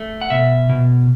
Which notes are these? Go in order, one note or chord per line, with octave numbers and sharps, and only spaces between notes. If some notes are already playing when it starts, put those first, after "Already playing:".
Already playing: A3
F#5
B2 E5
B2